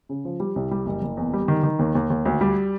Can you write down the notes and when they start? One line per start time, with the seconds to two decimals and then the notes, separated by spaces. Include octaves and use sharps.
0.09 C#3
0.25 F3
0.40 G3
0.56 C2
0.71 G3
0.86 F#1
1.02 F#1
1.17 E2
1.34 G3
1.48 D#3
1.63 D#3
1.79 D#2
1.95 D#2
2.10 D#2
2.26 D2
2.41 G3